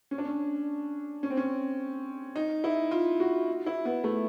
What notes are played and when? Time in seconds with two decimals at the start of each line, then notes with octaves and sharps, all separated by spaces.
0.11 C#4
0.18 D4
0.26 C#4
1.23 C#4
1.30 C4
1.37 C#4
2.36 D#4
2.64 E4
2.91 F4
3.20 F#4
3.66 E4
3.85 B3
4.04 A3